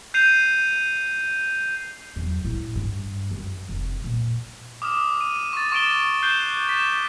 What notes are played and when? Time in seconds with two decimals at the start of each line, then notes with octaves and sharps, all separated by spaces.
0.14 G6 C7 D#7 F7
2.16 E2 F#3
2.45 A2 E4
2.76 G2
3.31 F#2
3.69 F1
4.04 A#2
4.82 D6 D#6 F6 E7
5.21 D#7
5.53 C#6 A6
5.72 C#6 D6 A6 D7 E7 G7
6.23 F#6 G6 C7 E7 G7
6.67 A6 B6 E7